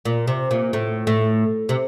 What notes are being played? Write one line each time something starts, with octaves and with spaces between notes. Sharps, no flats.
A#2
C3
A#2
A2
A2
C3